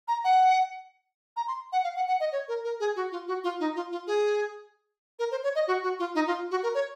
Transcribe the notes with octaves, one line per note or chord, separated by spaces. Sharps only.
A#5
F#5
A#5
C6
F#5
F5
F#5
F#5
D#5
C#5
A#4
A#4
G#4
F#4
F4
F#4
F4
D#4
F4
F4
G#4
A#4
C5
C#5
D#5
F#4
F#4
F4
D#4
F4
F#4
A#4
C#5